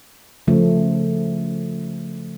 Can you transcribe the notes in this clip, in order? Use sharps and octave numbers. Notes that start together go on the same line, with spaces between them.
C#3 F3 A3